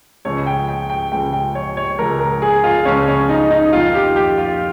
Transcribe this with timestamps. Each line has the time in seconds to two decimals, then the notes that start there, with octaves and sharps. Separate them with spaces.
0.25 C#2 C#3 F3 C#5
0.46 G5
0.68 G5
0.90 G5
1.12 C#2 C#3 F3 G5
1.33 G5
1.55 C#5
1.77 C#5
1.99 C#2 C#3 F3 A#4
2.20 A#4
2.42 G#4
2.64 F4
2.85 C#2 C#3 F3 C#4
3.08 C#4
3.29 D#4
3.51 D#4
3.73 F2 D#3 F4
3.94 G4
4.16 G4
4.38 F4